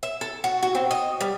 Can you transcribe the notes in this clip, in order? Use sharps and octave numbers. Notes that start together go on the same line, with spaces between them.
E5
A4
F#4
F#4
C4
D#5
G3